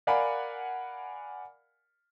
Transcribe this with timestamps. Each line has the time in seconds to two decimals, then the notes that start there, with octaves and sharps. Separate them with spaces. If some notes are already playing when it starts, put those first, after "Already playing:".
0.07 A#4 D5 F5 F#5 G#5 B5